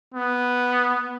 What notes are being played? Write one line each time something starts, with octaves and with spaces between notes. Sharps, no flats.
B3